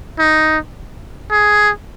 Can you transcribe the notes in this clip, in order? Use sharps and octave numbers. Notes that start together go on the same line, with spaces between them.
D#4
G#4